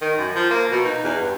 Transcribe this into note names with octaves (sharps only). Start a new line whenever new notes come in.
D#3
F#2
F3
A#3
B2
D#4
E2
G2